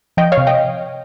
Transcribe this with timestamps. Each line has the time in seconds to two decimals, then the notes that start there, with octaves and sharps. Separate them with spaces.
0.17 F3 D#5 G5
0.32 C#5 F5
0.37 C3
0.47 D#5 G5